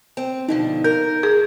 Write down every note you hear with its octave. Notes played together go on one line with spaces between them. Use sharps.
C4
B2 D3 F3 D#4
A#4 G6
G#4